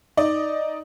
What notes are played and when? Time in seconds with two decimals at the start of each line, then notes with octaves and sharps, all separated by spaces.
0.17 D#4 D5 D#5